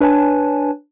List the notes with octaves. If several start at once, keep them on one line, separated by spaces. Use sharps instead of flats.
D4 B4 C#5 G#5 A5